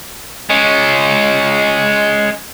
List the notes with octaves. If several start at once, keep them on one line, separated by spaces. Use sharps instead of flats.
G#3 C#4